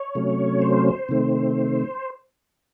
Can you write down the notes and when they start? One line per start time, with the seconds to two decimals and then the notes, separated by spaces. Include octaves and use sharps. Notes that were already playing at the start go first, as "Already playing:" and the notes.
Already playing: C#5
0.15 C3 F#3 A3 C#4
0.62 C5
1.09 C3 D#3 A3 C4